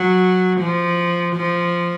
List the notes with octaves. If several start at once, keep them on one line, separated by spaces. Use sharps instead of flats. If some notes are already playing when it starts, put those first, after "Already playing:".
Already playing: F#3
F3
F3